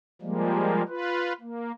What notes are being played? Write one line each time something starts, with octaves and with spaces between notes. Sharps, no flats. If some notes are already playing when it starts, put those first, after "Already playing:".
F3 G3 G#3 A#3
F4 B4
A#3